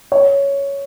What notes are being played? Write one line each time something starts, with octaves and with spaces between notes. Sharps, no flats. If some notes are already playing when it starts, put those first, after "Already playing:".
C#5